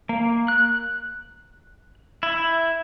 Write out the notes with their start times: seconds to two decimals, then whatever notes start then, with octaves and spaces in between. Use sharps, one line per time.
0.09 A#3
0.48 F#6
2.23 E4